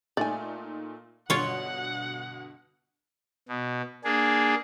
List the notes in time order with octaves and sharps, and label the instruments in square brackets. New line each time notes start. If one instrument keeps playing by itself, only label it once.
[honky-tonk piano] A#2 A3 D#4 [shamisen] D5 G#5
[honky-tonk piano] G2 B2 D3 [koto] F4 C#5 [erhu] F#5
[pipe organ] B2
A#3 D4 G#4